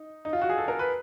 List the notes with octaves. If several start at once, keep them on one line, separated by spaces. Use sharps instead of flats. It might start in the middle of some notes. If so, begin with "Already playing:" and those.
Already playing: D#4
D#4
F4
F#4
G#4
A4
A#4
B4